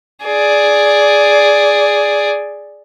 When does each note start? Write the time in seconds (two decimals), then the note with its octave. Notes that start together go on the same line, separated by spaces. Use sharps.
0.24 G#4 D5